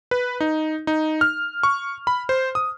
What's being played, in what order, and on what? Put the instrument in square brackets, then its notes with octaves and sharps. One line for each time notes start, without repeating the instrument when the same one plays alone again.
[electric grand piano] B4
D#4
D#4
F6
C#6
B5
C5
D#6